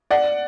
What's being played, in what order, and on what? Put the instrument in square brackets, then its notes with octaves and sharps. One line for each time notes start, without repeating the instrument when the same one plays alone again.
[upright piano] D5 F#5